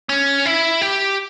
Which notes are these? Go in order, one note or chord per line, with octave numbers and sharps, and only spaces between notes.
C#4
E4
G4